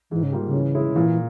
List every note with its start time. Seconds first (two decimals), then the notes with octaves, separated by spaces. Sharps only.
0.11 G#2 E3
0.23 C#3
0.32 G3 A#3 F4
0.47 C#3
0.54 E3
0.74 G#3 C#4 E4
0.92 C#3
0.96 A#2 E3